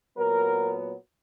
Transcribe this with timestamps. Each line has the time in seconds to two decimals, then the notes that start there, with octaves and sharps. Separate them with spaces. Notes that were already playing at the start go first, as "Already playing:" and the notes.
0.16 A#2 F#3 B3 A#4